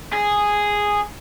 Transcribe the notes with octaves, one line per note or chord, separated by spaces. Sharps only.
G#4